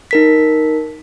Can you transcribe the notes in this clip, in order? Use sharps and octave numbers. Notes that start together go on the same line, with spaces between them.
D#4 A#4 B6